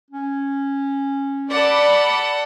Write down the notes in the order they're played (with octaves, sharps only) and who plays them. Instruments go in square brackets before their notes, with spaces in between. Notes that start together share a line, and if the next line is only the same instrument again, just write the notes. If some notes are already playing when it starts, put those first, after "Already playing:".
[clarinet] C#4
[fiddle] A4 F#5 [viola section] D5 B5